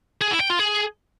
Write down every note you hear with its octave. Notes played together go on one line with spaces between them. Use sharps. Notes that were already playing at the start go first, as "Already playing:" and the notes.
G#4
E4
G5
F4
G#4